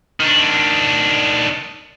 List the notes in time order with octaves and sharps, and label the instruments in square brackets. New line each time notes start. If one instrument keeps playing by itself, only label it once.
[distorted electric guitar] D#3 D4